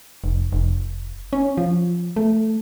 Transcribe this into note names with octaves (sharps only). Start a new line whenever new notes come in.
F1
F1
C#4
F3
A3